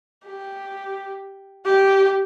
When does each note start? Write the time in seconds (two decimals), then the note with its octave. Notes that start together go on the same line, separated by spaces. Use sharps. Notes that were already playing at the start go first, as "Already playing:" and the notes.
0.26 G4
1.66 G4